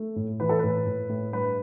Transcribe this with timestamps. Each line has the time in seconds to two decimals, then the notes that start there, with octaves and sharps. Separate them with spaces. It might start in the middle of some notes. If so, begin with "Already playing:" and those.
Already playing: A3
0.16 A2
0.40 E3 B4
0.49 A4
0.59 A2 B4
0.87 A2
1.09 A2
1.32 G2 B4